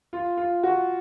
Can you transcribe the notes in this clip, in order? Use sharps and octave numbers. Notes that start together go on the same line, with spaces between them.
F4
F4
F#4